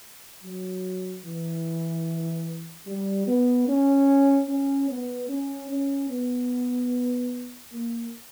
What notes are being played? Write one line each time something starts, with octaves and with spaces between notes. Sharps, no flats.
F#3
E3
G3
B3
C#4
C#4
B3
C#4
C#4
B3
A#3